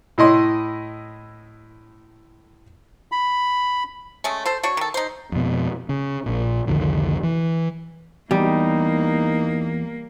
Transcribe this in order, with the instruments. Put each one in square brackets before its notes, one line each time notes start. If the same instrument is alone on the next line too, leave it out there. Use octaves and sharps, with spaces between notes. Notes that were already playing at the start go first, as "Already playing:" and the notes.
[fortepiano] A2 E4 D#5 C6
[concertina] B5
[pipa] G#3 A3 C#4
A4 C5
D4 F#4 C#5
D#3 A4
D#4 C5
[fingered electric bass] F2 B2
C#3
A#1 A#2
C2 F2 D3 D#3
E3
[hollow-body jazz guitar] E2 [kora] G3 [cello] A#3 [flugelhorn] D#4